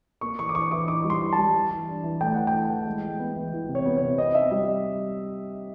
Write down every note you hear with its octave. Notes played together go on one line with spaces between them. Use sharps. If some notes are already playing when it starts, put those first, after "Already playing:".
A#3 C#6
E3 C#6
D6
E3 C#6
E3 D6
D#4 D6
G3
C6
E3
A5
G3
E3
E3
D4
E3
A3 G5
E3 F#5
G5
E3
E3
G#3
G#3
B3
E3
E3
C3
C#5
B3
C3 C#5
C4 D#5
D#4 E5
G3 D#5